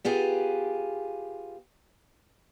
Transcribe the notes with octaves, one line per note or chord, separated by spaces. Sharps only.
B3 F4 G4 G#4